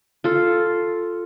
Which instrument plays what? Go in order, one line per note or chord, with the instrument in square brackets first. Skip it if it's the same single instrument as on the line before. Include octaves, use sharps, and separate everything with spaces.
[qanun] F4 A4